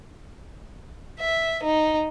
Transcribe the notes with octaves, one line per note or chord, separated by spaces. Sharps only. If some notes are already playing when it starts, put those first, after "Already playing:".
E5
D#4